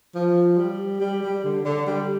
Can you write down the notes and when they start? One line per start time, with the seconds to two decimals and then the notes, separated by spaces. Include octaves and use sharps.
0.15 F3
0.57 G3
1.00 G3
1.22 G3
1.44 D3
1.65 D3
1.86 G3